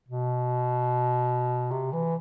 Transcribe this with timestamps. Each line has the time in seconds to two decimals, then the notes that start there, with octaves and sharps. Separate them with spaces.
0.08 B2
1.71 C3
1.93 E3